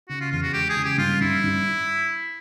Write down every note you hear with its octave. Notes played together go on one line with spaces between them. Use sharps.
C#3 F#4
F4
E2 F4
F#4
G#3 G4
G#4
C#3
G4
G2 F4
G2 E4
G2